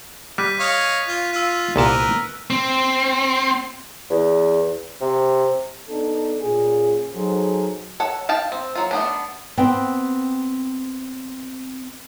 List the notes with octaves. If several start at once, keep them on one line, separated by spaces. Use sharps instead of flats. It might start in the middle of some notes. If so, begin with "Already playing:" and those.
G3 F#6 B6 D#7
C#5 D#5 F5
F4
F4 E6 D#7
C2 A#2 B3 A#4 A5
C4
E2
C3
B3 D4 D#4 A4
A#2 A#3 C#4 G#4
F#3 D#4 G#4 A4 C5
A4 C#5 F#5
F5 G5 A5
C4
F#3 F4
A3 B3 D4
B3 C4 G5